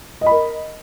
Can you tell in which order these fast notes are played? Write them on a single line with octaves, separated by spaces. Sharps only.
D#5 B5 A#4